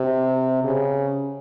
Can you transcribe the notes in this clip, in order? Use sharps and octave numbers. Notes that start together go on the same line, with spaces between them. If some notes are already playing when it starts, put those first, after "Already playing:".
Already playing: C3
C#3